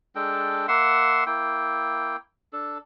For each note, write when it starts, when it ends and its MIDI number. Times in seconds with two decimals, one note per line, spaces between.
0.15 0.66 56
0.15 0.66 62
0.15 0.66 69
0.15 0.66 79
0.68 1.24 58
0.68 1.24 76
0.68 1.24 78
0.68 1.24 84
1.27 2.17 58
1.27 2.17 64
1.27 2.17 79
2.53 2.78 62
2.53 2.78 69